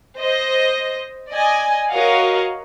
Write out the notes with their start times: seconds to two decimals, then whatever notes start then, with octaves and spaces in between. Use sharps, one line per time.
0.19 C5 D#5
1.30 D5 D#5 G#5
1.91 F#4 A#4 C#5 D#5 F5 F#5